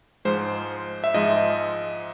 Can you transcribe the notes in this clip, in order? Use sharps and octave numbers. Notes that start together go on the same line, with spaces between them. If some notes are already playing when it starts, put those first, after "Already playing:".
G#2 F3 G#3 C5
E5
G#2 F3 G#3 D#5